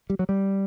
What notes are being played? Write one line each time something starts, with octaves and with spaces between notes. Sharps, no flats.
G3
F#3
G3